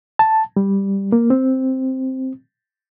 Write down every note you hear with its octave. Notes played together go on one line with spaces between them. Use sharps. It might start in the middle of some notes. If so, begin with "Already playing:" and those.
A5
G3
A#3
C4